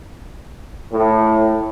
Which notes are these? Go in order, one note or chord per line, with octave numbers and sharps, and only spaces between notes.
A2